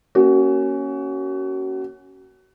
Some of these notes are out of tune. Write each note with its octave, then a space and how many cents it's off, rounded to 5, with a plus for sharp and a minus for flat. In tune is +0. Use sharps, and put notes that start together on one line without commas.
A#3 +0 C#4 +0 F#4 +30